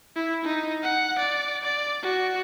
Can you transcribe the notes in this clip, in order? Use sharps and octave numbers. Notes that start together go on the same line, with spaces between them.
E4
D#4
F#5
D5
D5
F#4